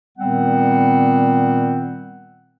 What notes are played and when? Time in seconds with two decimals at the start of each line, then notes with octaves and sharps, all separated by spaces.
0.18 A#2 D#3 G3 B3 C4 F#5